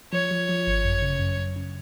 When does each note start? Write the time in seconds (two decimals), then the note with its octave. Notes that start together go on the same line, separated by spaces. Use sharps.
0.13 F3 C#5
0.31 F3
0.49 F3
0.67 G#1
0.85 F#2
1.02 C#3
1.20 F#2
1.37 F#2
1.56 C#3